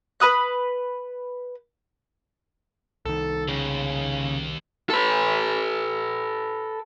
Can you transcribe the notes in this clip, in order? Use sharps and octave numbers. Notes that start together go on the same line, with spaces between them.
B4 B5 D#6 F#6
C2 D#3 A4
D#2 C#3
A4 B4